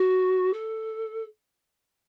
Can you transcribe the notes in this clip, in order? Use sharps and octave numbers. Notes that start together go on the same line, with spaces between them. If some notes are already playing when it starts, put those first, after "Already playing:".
Already playing: F#4
A4